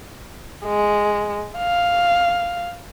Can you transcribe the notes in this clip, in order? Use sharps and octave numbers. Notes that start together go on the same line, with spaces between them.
G#3
F5